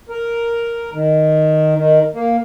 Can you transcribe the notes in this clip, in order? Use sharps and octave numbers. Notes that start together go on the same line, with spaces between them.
A#4
D#3
D#3
A#3